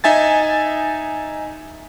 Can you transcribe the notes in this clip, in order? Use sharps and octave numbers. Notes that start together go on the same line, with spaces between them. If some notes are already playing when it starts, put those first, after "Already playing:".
D#4 E5 G#5 A6